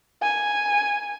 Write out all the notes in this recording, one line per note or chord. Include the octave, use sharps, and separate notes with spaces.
G#5